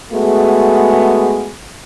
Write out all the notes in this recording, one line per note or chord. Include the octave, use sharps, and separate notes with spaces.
G#3 A3 B3 F#4 G#4